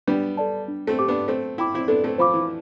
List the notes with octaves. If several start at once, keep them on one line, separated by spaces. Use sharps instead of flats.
G3 B3 D4
A4 D5 A5
D4
A3 C4
G4 C5 G5 D6
B3 D4
A3 C4 C5
E4 G5 B5 D6
C4 E4
B3 D4 A4
A3 C4
F3 C5 F5 B5 D6
E3